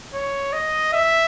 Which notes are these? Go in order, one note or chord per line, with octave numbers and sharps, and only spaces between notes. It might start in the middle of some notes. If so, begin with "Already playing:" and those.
C#5
D#5
E5